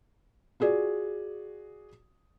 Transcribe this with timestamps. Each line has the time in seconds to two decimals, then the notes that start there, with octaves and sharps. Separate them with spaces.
0.60 F4 F#4 G#4 D5